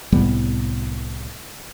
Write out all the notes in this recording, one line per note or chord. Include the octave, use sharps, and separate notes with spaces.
C2 A2 G3 B3